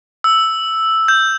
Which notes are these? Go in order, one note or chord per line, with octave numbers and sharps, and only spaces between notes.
E6
G6